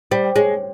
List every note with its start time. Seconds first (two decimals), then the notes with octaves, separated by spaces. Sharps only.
0.11 G3 C5
0.35 G#3 C#5